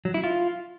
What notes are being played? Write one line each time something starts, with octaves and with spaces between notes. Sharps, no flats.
F#3
E4
F4